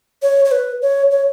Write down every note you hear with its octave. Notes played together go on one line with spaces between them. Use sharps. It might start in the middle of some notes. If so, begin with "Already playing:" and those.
C#5
C#5
B4
C#5
C#5